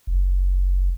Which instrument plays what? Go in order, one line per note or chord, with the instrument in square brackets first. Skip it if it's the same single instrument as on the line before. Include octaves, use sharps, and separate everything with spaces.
[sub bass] F#1